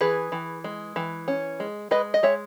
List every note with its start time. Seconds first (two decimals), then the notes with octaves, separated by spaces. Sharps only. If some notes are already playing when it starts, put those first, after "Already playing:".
0.01 E3 G#4 B4
0.32 E3
0.64 G#3
0.96 E3
1.28 C#4
1.60 G#3
1.91 G#3 B4 D#5
2.14 D#5
2.23 G#3 C#5 E5